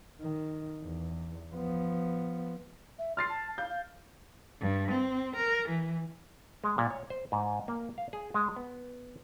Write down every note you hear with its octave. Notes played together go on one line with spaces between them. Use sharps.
D#3
E2
F3 B3
E5
C6 F6 A6 C7
A5
F5 G6
F5
G2
C4
A#4
E3
G#3
A#2
C#5
C5
G#2
A#3
F5
G#4
G#3
B3